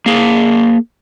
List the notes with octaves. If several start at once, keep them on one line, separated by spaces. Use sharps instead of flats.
A#3 G#4